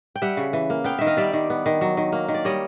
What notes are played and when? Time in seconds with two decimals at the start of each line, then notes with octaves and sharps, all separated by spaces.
0.15 G5
0.22 G3 E5 F#5
0.37 C#3
0.53 E3
0.70 A#3
0.84 B3 F5 G5
0.99 D#3 E5
1.07 D#5 F5
1.17 G3 D5 E5
1.33 D#3
1.50 B3
1.66 D#3
1.81 F#3
1.97 D#3
2.12 A#3
2.28 D#3
2.34 D5
2.45 G3 C#5 D#5